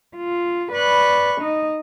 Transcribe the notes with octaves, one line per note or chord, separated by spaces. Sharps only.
F4
B4 D5 B5 C#6 F#6
D#4 D#5